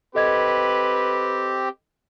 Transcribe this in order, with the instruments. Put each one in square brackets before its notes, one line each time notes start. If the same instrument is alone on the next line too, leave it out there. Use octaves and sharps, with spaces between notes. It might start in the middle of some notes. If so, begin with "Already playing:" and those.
[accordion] C4 G4 [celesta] A4 D#5 G#6 [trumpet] B4